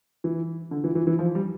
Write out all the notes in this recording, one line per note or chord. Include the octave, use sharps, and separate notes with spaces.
E3
D3
E3
E3
E3
F3
G3